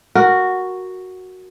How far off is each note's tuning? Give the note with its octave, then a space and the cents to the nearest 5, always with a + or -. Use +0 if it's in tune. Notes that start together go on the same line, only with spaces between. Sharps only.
F#4 +0 A#4 +0